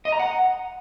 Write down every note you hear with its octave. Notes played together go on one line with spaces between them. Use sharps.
D#5
A#5
F#5